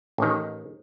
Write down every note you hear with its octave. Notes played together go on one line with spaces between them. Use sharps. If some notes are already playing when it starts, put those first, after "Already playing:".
A1 D#3